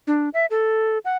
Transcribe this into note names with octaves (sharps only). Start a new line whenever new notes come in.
D4
E5
A4
F#5